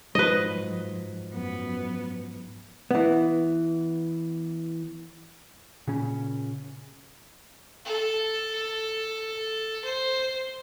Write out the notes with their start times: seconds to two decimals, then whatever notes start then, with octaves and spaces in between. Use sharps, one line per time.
0.15 G#2 F3 F#3 B4 D#5
1.30 F#2 B3
2.91 E3 B3
5.87 A#2 C#3 C#4
7.85 A4
9.84 C5